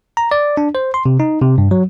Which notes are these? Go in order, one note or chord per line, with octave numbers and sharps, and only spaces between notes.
A#5
D5
D4
C5
C6
C3
D#4
C3
G2
F#3